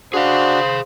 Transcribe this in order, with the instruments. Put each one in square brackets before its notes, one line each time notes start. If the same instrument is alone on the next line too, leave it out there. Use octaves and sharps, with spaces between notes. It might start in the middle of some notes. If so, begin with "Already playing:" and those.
[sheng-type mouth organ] D4 F#4 [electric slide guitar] G#4 F5 [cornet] C5